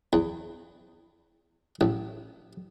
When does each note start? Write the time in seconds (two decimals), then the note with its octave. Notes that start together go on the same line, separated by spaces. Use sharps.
0.13 E2
1.81 A1